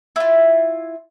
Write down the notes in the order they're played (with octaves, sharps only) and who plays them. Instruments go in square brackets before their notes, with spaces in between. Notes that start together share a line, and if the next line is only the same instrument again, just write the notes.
[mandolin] E4 F4